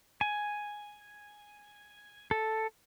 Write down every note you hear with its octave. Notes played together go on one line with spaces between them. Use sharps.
G#5
A4